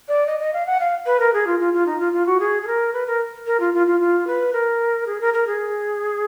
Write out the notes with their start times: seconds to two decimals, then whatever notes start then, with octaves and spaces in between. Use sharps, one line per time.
0.08 D5
0.26 D#5
0.39 D#5
0.53 F5
0.66 F#5
0.80 F5
1.06 B4
1.19 A#4
1.33 G#4
1.47 F4
1.59 F4
1.73 F4
1.86 D#4
1.99 F4
2.13 F4
2.26 F#4
2.39 G#4
2.62 G#4
2.66 A#4
2.93 B4
3.07 A#4
3.46 A#4
3.59 F4
3.73 F4
3.87 F4
4.00 F4
4.27 B4
4.53 A#4
5.06 G#4
5.20 A#4
5.33 A#4
5.46 G#4